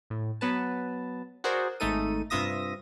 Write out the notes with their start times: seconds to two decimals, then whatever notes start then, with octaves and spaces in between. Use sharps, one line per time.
0.10 A2
0.41 F#3 B3 B4 A5
1.44 F#4 G#4 A#4 C5 D5
1.80 G#1 G#3 A3 D#4 A4 D#7
2.30 G2 C3 F4 E5 D#6 A#6